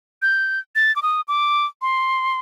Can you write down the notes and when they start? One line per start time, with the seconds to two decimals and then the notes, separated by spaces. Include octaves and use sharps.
0.22 G6
0.75 A6
0.96 D6
1.02 D#6
1.28 D6
1.82 C6